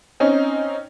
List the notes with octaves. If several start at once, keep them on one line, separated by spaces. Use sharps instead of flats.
C4 C#4 D#4